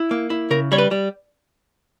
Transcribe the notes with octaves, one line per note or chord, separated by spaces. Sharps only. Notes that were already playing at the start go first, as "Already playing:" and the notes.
Already playing: E4
A#3
E4
C#3 A#4
G3 C#5
B4
G3